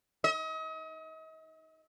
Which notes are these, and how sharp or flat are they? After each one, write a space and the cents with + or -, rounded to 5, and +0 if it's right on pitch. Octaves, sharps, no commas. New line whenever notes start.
D#5 +40